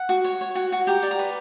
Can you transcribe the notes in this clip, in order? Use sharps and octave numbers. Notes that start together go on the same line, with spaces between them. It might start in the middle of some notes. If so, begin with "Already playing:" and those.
Already playing: F#5
F#4
C#5
C#5
F#4
F#4
G4 A#5
D5
A#5
B4